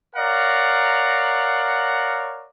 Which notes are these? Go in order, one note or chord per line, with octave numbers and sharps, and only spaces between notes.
A#4 C#5 D5 F5 F#5 A#5